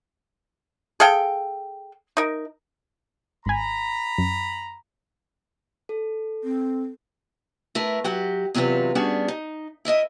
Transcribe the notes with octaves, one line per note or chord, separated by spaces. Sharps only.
G#4 A4 F5 G5
D#4 A#4
G#1 G#5 A#5 B5
F#2
A4
C4
A3 E4 A#4 B4
F#3 F#4 G4
E2 C3 F#3 F4 F#4 B4
G3 B3 C#4 D4 F#4 G#4
D#4
E4 A#4 D#5 E5